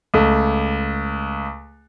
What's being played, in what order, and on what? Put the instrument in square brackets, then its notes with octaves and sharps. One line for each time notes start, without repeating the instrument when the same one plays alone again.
[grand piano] C#2 A3